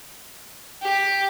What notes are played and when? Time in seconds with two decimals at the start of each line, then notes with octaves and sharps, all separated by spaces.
0.83 G4